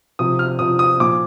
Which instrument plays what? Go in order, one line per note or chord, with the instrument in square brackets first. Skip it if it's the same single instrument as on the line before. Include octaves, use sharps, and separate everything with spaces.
[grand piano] C3 F3 D#6
F6
C3 F3 D#6
D#6
A#2 F3 D6